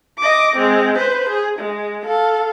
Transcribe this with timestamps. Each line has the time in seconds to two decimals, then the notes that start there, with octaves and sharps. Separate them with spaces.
0.19 D#5 D6
0.56 G#3 C4
0.97 B4 C5
1.29 G#4
1.59 G#3
2.05 A4 F5